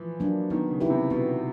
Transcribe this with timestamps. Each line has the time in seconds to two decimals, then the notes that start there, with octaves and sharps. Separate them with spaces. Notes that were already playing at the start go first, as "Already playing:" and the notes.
Already playing: E3 F3
0.20 F#3 A#3 D4
0.50 D#3 B3
0.70 C#3
0.80 E4 G4 B4
0.90 C3
1.10 B2 B3